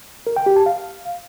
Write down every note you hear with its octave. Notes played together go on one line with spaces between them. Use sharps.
A#4
G5
G4
A5
F5